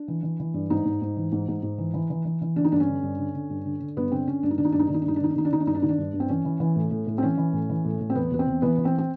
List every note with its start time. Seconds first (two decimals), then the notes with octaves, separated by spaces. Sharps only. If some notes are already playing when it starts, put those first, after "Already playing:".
Already playing: D4
0.08 E3
0.23 E3
0.40 E3
0.54 G2
0.70 G#2 D#4
0.85 G#2
1.02 G#2
1.17 E3
1.32 G#2
1.48 G#2
1.63 G#2
1.78 E3
1.94 E3
2.10 E3
2.25 E3
2.42 E3
2.56 D3 D4
2.65 D#4
2.72 G2 D4
2.80 C#4
2.87 D3
3.03 G2
3.19 D3
3.34 D3
3.50 G2
3.65 D3
3.80 D3
3.97 G2 B3
4.12 D3 C4
4.27 D3 C#4
4.43 G2 D4
4.51 D#4
4.58 D#3 D4
4.65 D#4
4.72 G2 D4
4.79 D#4
4.87 D#3 D4
4.94 D#4
5.02 D4
5.05 G2 D#4
5.16 D4
5.21 D#3 D#4
5.30 D4
5.36 D#3 D#4
5.45 D4
5.52 D#3 D#4
5.60 D4
5.67 G2 D#4
5.75 D4
5.82 D#3 D#4
5.89 D4
5.98 G2
6.13 G2
6.20 C4
6.29 E3 C#4
6.45 E3
6.60 E3
6.76 A2
6.91 A2
7.07 A2
7.18 C4
7.23 E3 C#4
7.38 E3
7.53 A2
7.69 E3
7.85 A2
8.01 A2
8.10 C4
8.15 E2 B3
8.31 E2 B3
8.39 C4
8.47 E2
8.62 E3 B3
8.78 E3
8.85 C4
8.98 C4